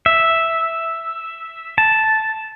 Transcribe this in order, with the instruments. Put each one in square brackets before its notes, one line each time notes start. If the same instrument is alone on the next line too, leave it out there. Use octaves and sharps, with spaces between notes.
[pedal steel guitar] E5
A5